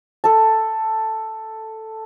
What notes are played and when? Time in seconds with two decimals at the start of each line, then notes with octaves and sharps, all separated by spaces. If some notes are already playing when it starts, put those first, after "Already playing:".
0.24 A4 A5